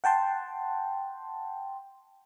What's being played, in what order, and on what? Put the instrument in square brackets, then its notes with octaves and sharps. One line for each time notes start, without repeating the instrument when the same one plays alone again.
[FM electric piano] F#5 G5 A5 C6